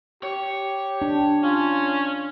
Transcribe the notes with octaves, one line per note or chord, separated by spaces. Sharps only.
G4 C#5
D4
C#4 F4